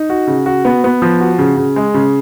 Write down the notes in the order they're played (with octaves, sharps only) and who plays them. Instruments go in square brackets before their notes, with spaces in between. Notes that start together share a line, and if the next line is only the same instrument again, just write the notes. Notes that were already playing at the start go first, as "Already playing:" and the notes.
Already playing: [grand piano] D#4
F#4
C#3
F#4
B3
B3
F3
F#4
C#3
C#3
G#3
C#3